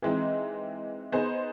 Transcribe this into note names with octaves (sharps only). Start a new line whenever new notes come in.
E3 G#3 C4 D#4
B3 D#4 G#4 C5